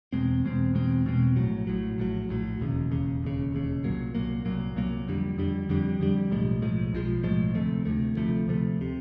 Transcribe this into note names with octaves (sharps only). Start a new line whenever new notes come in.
E2 B2 G#3 C4
E2 B2 G#3 C4
E2 B2 G#3 C4
E2 B2 G#3 C4
A#1 A2 F#3
A#1 A2 F#3
A#1 A2 F#3
A#1 A2 F#3
E1 D#2 C#3
E1 D#2 C#3
E1 D#2 C#3
E1 D#2 C#3
C2 A#2 F#3 A#3
C2 A#2 F#3 A#3
C2 A#2 F#3 A#3
C2 A#2 F#3 A#3
F2 D3 G3
F2 D3 G3
F2 D3 G3
F2 D3 G3
B1 A2 F3 G#3
B1 A2 F3 G#3
B1 A2 F3 G#3
B1 A2 F3 G#3
D2 C3 F3 A3
D2 C3 F3 A3
D2 C3 F3 A3
D2 C3 F3 A3
C3